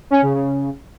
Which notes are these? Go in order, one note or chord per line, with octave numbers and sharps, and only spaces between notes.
C#4
C#3
C#3